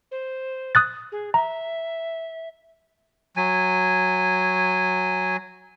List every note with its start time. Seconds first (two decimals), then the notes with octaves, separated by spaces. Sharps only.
0.11 C5
0.75 D#6 F#6 A6
1.12 G#4
1.34 E5 A#5
3.37 F#3 G#5